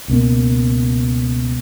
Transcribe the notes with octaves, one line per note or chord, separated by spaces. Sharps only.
C#2 B2 A#3